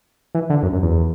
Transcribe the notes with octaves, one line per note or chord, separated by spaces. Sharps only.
E3
D3
F#2
F#2
E2